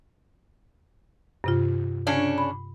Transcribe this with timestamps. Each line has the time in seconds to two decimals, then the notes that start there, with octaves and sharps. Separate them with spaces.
1.44 G2 C3 F4
2.07 C#3 C#4 D4
2.38 B5